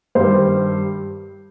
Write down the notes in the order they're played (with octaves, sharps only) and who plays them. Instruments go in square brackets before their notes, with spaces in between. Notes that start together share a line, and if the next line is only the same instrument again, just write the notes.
[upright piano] G2 D#3 G3 C5